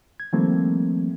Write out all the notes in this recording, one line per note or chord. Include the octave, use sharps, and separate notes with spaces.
G#6
D#3 F3 G3 A3 A#3 C4